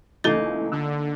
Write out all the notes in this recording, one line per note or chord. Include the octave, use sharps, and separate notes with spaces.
C#2 E3 A3 A#3 D#4 A4 A6
D3 E6